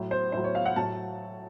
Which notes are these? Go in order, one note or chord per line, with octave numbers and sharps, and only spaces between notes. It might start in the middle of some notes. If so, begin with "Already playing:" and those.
Already playing: A2 F#3
C5
A2 F#3 C5
C#5
F5
F#5
A2 F#3 A5